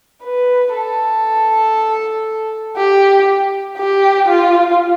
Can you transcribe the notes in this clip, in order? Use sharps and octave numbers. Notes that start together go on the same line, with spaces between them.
B4
A4
G4
G4
F4